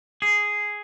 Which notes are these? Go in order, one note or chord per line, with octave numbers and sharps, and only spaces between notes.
G#4